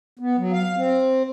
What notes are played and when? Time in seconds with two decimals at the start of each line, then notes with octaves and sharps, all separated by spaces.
0.19 B3
0.37 F#3
0.52 F5
0.76 C4